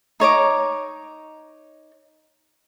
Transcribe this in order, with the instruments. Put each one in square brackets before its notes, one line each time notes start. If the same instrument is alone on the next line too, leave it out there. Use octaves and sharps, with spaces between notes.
[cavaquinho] D#4 C#5 A#5 D6